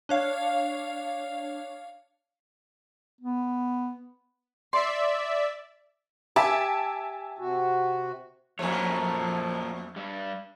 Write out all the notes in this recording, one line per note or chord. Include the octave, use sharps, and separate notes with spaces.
D4 C#5 F5
B3
D5 E5 C6
G4 E5 G#5 A5
C3 F#4
F2 F3 A3 A#3 F4 C#5
G2 G3